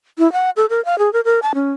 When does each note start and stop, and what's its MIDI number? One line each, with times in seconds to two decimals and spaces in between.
0.18 0.31 64
0.32 0.50 78
0.57 0.66 69
0.70 0.83 70
0.85 0.98 77
0.99 1.12 68
1.13 1.21 70
1.25 1.40 70
1.42 1.52 81
1.55 1.72 61